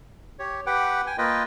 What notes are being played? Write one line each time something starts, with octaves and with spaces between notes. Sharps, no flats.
G4 C#5
G4 B4 F#5 G5 D6
G5 G#5
A#3 F4 B4 D#5 G5